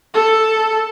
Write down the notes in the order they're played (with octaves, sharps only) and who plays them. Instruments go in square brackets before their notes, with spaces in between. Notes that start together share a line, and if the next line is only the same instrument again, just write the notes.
[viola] A4